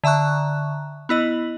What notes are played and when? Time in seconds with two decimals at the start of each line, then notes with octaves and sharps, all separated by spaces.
0.04 D3 E5 A#5 C#6 F#6
1.09 B3 E4 D#5 F#7